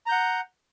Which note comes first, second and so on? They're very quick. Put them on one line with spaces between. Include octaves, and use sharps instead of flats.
A#5 G6 F#5